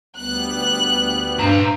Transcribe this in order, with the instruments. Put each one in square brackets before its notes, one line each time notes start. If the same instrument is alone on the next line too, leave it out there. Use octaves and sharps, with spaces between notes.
[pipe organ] D2 G3 B3 [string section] F#6
[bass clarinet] G2 [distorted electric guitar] C5 A#5